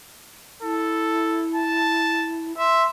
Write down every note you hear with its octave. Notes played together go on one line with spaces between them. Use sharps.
E4 A4
A5
E5 C6